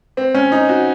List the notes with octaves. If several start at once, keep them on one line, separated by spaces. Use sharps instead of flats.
C4
C#4
D#4
F#4